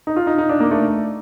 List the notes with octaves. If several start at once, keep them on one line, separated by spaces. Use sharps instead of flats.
D#4
F4
D#4
D#4
D4
A#3
A3